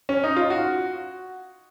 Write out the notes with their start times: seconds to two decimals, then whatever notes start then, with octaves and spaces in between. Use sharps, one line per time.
0.09 C#4
0.24 D#4
0.36 F4
0.50 F#4